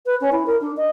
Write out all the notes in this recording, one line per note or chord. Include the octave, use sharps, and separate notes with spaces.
B4
C#4
E4
A#4
D4
D#5